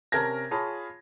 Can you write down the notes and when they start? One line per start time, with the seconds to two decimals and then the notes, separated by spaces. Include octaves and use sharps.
0.12 C3 C#4 A#4 A5 G#6 A#6
0.51 F4 G#4 C#5 A5 B5